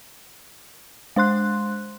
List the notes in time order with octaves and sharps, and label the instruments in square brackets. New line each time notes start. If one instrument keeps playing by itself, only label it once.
[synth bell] G#3 C5 C6 F#6